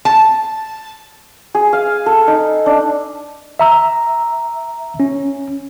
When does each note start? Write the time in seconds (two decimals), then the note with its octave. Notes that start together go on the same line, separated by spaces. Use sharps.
0.05 A5
1.55 G#4
1.73 F5
2.06 A4
2.27 D#4
2.66 D4
3.60 E5 A#5 E6
5.00 C#4